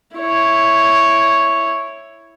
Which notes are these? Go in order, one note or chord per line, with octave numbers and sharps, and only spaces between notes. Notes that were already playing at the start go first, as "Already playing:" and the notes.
E4 C#5